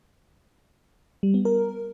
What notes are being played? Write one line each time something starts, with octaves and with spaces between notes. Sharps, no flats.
G3
B3
A#4